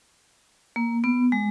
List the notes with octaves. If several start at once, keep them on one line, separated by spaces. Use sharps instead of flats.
A#3
B3
G#3